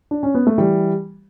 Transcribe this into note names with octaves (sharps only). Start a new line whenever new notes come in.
D4
C#4
B3
A3
E3 G3